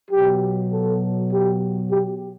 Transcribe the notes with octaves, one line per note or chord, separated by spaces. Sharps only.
B2 F#3 G4
A4
G4
G4